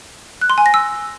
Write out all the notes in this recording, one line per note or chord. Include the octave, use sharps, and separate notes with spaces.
F#6
C6
G#5
A#6
E6